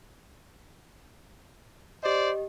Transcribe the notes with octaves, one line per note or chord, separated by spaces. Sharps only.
G4 C5 D5 D#5